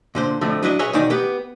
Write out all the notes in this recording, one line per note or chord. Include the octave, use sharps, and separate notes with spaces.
A#2 D3 C5
F2 A2 D3 F3 A3
F#3 D4 E4 D#5
G#4 B4 C#5 D#5 E5 G#5
E2 B2 D#3 D#4 D5
B3 G4 B4